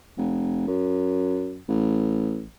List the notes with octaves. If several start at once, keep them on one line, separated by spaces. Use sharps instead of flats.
F1
F#2
A1